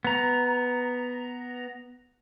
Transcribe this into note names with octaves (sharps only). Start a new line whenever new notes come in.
B3 A#5